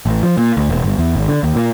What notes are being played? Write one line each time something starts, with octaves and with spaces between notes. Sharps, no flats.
A1
F3
A#2
D2
E1
G1
E2
G#1
D3
D#2
A#2